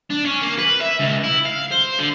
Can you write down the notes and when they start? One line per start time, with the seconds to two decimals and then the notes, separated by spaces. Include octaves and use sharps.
0.10 D4
0.25 C#4
0.42 A#3
0.58 B4
0.81 E5
1.00 C#2
1.24 E4
1.45 F5
1.71 C5
1.99 D3